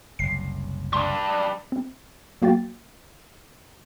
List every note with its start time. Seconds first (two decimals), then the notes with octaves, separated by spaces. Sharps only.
0.19 F#1 C2 C7
0.93 G3 D4 C6
1.72 C4
2.42 F#3 A#3 F#4 G5 A6